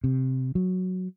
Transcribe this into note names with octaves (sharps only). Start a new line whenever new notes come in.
C3
F#3